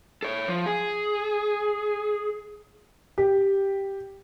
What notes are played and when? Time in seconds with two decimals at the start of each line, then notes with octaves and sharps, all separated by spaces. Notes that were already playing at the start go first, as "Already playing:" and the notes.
0.23 A4 C#5
0.48 F3
0.66 G#4
3.18 G4